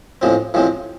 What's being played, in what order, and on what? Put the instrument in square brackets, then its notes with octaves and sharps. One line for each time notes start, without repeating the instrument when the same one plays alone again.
[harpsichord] A1 A2 F3 G#3 C4
A1 A2 F3 G#3 C4